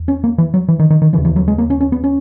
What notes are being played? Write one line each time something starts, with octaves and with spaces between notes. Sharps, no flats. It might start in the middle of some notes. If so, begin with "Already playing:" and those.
Already playing: E2
C#4
A#3
E3
F#3
E3
D#3
D#3
D#3
D#2 C#3 E3
E3
F#3
G#3
A#3
C#4
C#4
B3
C#4